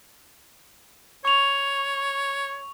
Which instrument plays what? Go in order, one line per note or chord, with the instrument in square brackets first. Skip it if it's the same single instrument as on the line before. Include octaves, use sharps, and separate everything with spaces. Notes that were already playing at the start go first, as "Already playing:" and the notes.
[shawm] C#5 [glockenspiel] C#6 F7